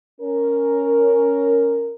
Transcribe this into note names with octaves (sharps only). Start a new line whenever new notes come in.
C#4 A#4